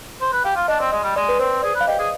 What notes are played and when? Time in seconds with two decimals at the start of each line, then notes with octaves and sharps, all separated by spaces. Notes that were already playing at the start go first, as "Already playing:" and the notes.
0.21 C5
0.32 B4
0.44 G4 F5
0.56 F4
0.68 D4 D#5
0.80 C4 D5
0.92 G#3 D#5
1.03 G3
1.16 G#3 D5
1.29 B4
1.39 C4 C5
1.63 G#4 D5
1.75 B4
1.80 F5
1.87 G4 D#5
1.99 G#4